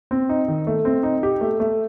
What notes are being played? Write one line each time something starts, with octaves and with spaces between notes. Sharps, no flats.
C4
D#4
D#3
A3
C4
D#4
G4
A3
A3